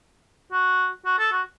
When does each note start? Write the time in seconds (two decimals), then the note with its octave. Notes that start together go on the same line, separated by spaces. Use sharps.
0.52 F#4
1.05 F#4
1.18 A4
1.32 F#4